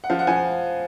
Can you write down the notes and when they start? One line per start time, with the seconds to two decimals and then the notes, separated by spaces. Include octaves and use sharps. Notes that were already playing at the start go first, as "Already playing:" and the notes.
0.04 F#5
0.10 F3 F5
0.19 F#5
0.27 F3 G#5